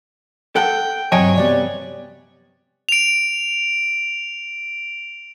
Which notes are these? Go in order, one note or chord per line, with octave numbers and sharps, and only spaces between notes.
A4 F#5 G5
G2 C3 F#3 C#5 D#5 G5 G#5
C3 G3 B3 D5
D7 F7